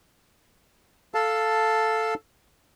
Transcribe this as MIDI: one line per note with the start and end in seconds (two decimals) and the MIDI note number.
1.14 2.14 69
1.14 2.14 77
1.14 2.14 81